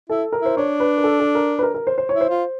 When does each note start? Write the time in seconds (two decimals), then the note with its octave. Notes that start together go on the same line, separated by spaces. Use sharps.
0.09 E4 A4
0.32 A#4
0.41 E4 C5
0.57 D4 C#5
0.80 B4
0.97 A#4
1.04 A4
1.20 A4
1.35 A#4
1.59 B4
1.63 A#4
1.74 A#4
1.87 C5
1.98 C5
2.09 E4 C#5
2.21 C5
2.29 F4